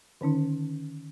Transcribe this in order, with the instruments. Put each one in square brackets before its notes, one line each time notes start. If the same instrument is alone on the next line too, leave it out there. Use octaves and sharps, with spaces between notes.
[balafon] D3 D#3 C#4 D#4